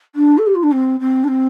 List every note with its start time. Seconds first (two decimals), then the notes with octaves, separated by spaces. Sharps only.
0.15 D4
0.38 A4
0.47 G4
0.55 F4
0.63 D4
0.72 C4
1.00 C4
1.24 D4
1.28 C4